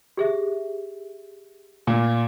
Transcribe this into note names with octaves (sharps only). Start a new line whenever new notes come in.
G4 G#4 E5
A#2